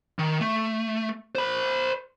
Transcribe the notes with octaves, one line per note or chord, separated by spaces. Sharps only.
D#3
A3
C5 B5